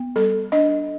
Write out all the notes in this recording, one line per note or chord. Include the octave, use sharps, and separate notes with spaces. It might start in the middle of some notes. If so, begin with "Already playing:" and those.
Already playing: B3
G3 A4
D4 D#5